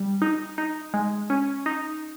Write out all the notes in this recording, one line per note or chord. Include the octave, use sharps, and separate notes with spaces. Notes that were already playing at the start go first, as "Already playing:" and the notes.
Already playing: G3
D#4
D#4
G#3
C#4
D#4